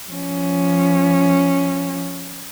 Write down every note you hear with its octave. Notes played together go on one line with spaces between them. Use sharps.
F3 C#4